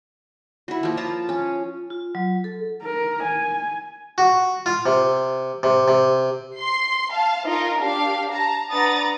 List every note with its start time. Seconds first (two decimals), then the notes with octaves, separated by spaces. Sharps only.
0.68 E4 F#4
0.83 F3 A#3
0.97 F4 A5 A#5
1.29 C#4
1.90 F4
2.15 F#3
2.44 A4
2.83 A#4
3.23 G#5
4.18 F#4
4.66 F4
4.86 C3
5.63 C3
5.88 C3
6.58 C6 C7
7.11 F5 A5
7.46 D#4 F4 A#4
7.79 D4 G4 F5
8.30 A5 A#5
8.71 D4 B4 F#5 A#5 D#6 A6